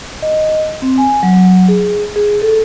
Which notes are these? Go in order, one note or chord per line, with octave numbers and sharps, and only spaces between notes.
D#5
C4
G#5
F#3
G#4
G#4
A4